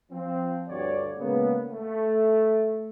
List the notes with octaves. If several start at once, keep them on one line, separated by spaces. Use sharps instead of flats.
F3 C4
D2 G2 C#5 D5
A#2 C#3 G#3 A#3 B3
A3